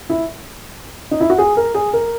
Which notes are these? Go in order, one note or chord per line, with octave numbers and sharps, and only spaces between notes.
E4
D#4
E4
F#4
G#4
A#4
G#4
A#4